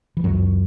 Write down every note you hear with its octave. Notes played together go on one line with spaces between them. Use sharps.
E3
C#2 F#2 F#3